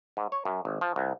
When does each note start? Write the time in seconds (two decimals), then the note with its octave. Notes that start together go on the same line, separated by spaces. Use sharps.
0.17 G#2
0.32 C#5
0.45 F#2
0.65 G#1
0.81 F3
0.96 C2